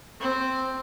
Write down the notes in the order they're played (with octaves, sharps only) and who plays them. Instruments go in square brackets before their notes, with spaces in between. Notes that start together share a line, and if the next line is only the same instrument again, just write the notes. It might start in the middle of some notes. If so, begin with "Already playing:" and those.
[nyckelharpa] C4